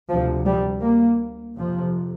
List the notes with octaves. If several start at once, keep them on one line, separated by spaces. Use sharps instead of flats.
D2 C3 F3
G3
A#3
F2 C3 F3